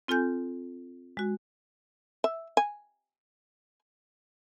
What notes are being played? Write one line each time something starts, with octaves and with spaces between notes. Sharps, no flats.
C4 F4 A4 G#5 G6
G#3 F#4
E5
G#5